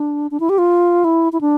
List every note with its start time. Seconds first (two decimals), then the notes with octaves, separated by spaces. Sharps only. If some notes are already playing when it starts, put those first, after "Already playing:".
Already playing: D4
0.31 D4
0.40 E4
0.49 G4
0.58 F4
1.04 E4
1.33 E4
1.41 D4